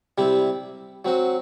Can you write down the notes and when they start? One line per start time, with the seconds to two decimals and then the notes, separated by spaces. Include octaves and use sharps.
0.18 C3 G3 C4 E4
1.05 F#3 C4 F#4